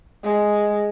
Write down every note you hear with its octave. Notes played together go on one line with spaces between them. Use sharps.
G#3